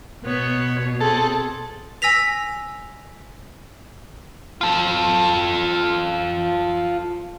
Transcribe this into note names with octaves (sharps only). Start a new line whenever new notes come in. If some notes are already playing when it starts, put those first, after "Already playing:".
B2 B3 C#5
C4 G#4 A4
G#5 E6 A#6 B6 F7
F4 A4